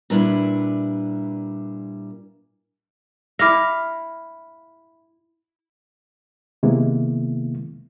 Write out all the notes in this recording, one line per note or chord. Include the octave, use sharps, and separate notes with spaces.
A#2 G3 D4 E4 B4
E4 F5 D6 F6 A#6
C3 D#3 G#3 A#3 B3 E4